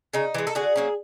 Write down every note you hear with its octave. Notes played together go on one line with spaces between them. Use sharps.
C#3 D#4
E3 G#3
A4
D3 F#4 G#4
F#3 A#3 C#4